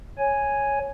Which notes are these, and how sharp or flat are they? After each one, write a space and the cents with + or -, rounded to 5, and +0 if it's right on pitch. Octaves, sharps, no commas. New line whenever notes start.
C#5 +0 G#5 +0